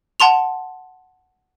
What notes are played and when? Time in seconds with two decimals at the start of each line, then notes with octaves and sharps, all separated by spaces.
0.20 F#5 A5 C6 F7